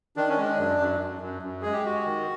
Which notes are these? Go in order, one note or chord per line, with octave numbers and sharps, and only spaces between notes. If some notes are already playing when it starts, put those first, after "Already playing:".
D#3 D4
C#4
G#3 D4
F#2
F#2
F#2
F#2
F#2
G#3 G#4
G4
G#3 F#4
D#3